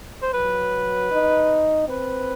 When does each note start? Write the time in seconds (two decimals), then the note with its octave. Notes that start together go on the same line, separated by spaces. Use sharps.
0.22 C5
0.33 F#3 B4
1.12 D#4
1.88 C4 B4